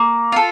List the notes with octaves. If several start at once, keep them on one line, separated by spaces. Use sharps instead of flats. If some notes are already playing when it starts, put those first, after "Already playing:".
Already playing: A#3
F4 A4